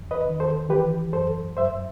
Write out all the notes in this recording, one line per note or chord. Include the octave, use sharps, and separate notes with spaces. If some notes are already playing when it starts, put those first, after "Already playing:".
Already playing: E2
B4 D#5
D#3
A4 C5
E3 G4 B4
F#2 A4 C5
F#2 C5 E5